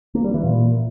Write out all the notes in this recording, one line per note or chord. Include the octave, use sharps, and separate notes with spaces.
A#3
G3
E3
A#2